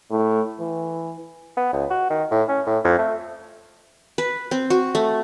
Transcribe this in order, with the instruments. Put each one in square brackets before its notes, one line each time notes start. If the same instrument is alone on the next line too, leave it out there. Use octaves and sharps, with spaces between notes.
[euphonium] A2
E3
[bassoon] B3
C#2
F#4
D#3
A2
C#4
A2
F2
A3
[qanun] B4
C4
F#4
A3